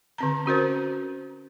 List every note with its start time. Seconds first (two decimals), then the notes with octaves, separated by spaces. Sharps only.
0.18 D3 C4 A#5
0.46 C#4 F#4 A#4 C5